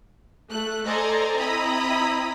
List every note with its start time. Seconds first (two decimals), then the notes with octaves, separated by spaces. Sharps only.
0.49 A3 F#6
0.86 A4 C5 D5 D#5 G#5 A#5
1.37 C4 E4 D#5 A#5 B5 D#6